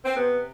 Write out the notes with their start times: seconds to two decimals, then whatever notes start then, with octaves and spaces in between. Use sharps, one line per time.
0.05 C4
0.16 C3 B3